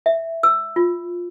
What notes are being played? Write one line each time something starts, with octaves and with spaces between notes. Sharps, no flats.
E5
E6
F4